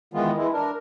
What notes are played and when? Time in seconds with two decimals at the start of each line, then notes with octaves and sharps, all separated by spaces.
0.14 D#3 E3 G#3 B3 F4
0.37 E3 G#3 E4
0.53 D4 A#4